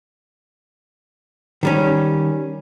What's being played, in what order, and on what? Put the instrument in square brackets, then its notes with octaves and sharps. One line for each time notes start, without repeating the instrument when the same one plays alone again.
[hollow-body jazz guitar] D#3 G3 C#4